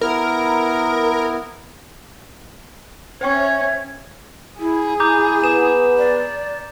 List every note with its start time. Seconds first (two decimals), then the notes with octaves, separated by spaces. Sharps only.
0.01 B3 E4 A#4
3.21 C#4 C5 C#5 E5 G5 C#6 G#6
4.60 E4 G#4
5.00 E4 A#5 D6 G6
5.44 B3 B4 E7
5.98 D5